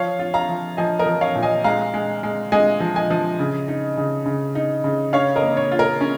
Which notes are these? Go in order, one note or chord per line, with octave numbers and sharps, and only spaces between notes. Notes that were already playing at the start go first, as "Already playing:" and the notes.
Already playing: F3 C#5 F5
F4
F5 A#5
F3
F3 D#5 G#5
A#4 D#5
F3
C#5 F5
A#2
D#5 G#5
G#3 F5 A#5
G#3
G#3
G#3 D#5 G#5
F3
D#5 G#5
F3
C#3
D#4
C#3
C#3
D#4
C#3
C#4 C#5 F5
A#4 D#5
A#3
C#5
F4
A#4
C#4